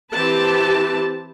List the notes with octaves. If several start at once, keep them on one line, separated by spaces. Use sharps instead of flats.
E3 C4 G4 B4 A5